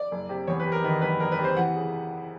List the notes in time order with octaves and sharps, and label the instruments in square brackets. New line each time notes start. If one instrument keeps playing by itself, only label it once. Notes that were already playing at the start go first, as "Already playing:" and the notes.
Already playing: [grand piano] D5
F#1
C3
E2 C#5
B4
C3
A#4
D#3 B4
F#1 B4
F#1 A#4
B4
C3
C5
E3 F#5
C#3